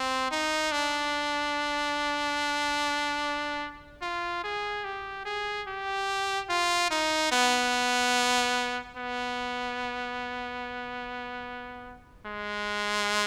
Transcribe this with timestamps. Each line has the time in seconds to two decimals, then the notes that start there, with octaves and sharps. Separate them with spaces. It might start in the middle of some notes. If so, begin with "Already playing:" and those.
Already playing: C4
0.31 D#4
0.72 D4
4.02 F4
4.44 G#4
4.84 G4
5.25 G#4
5.67 G4
6.49 F4
6.91 D#4
7.32 B3
8.97 B3
12.26 G#3